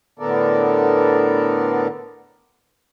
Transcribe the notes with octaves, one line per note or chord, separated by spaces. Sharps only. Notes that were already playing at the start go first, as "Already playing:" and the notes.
A2 D3 B3 A4 A#4 D5